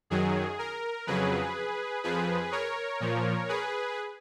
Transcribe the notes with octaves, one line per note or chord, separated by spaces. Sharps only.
F#2 D#3 F#3 G#4
A#4
F2 C#3 F#3 G#4 B4
F2 F3 G#4 B4
A#4 C#5
A#2 F3
G#4 B4